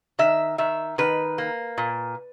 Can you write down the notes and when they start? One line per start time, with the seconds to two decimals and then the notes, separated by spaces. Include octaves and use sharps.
0.19 D#3 E5
0.58 D#3 E5
0.98 D#3 B4
1.38 A#3
1.78 A#2